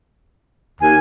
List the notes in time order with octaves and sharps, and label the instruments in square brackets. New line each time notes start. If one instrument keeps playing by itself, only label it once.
[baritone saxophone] D#2 [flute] G#5